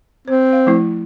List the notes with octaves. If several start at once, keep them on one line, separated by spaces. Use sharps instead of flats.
C4 C5
F5
F3 A3 E4